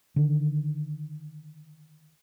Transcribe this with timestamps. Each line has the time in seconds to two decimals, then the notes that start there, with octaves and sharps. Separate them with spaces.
0.16 D3 D#3